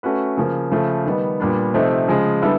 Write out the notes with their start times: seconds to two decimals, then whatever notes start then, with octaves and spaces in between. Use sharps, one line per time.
0.03 A3 C#4 F#4 B4
0.37 C#3 F3 A#3
0.71 C#3 F3 A3
1.05 D#3 G3 B3 D#4
1.40 A#2 G3 B3 D4
1.74 C3 F3 A3 C4 D#4
2.08 C#3 F3 G#3
2.42 D3 G3 B3 E4 A4